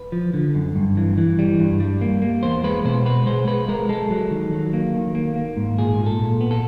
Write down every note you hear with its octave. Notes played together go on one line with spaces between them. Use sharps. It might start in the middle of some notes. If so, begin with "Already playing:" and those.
Already playing: B4
F3
D3
F#2
G2
E3
E3
G3
G2
G3
A#3
A#3
E2 C5
G#3 B4
B2 C5
B3 B4
G#3 C5
G#3 B4
G#3 A#4
G#3 A4
F#3
D#3
F#3
A#3
D#3
A#3
A#3
G#2
A#2 G#4
A#2
A4
A#2
B3
A4